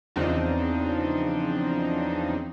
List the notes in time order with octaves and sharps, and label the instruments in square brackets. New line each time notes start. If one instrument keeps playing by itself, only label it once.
[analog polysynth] E2 C#3 F3 C4 D4 D#4